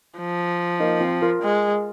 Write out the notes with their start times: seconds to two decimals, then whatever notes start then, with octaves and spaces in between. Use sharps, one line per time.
0.19 F3
0.80 A#3 D#4
1.01 C4 F4
1.22 F4 A#4
1.42 G#3